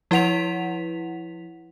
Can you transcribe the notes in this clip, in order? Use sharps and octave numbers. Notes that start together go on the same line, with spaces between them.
F3 E4 B4 F#5 B6 F7